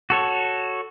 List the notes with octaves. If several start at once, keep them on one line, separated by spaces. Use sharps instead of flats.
F#4 A4 C#5